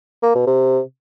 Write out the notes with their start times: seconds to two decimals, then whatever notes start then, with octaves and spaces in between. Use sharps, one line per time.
0.23 A#3
0.35 B2
0.47 C3